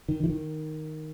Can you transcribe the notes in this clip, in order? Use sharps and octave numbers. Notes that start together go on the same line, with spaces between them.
D#3
E3
D#3